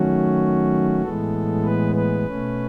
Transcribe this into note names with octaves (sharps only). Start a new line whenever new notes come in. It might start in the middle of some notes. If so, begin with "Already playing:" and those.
Already playing: D#3 F#3 A3 C#4 F#4
A2 E3 G#3 B3 A4
B4
B4
B2 A3 C#4